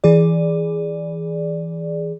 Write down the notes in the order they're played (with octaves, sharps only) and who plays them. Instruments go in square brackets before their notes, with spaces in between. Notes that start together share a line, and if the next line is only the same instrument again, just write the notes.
[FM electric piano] E3 G#4 D5